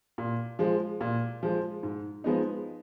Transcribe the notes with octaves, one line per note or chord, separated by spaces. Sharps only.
A#2
F3 G#3
A#2
F3 G#3
G#2
F3 G#3 B3 D#4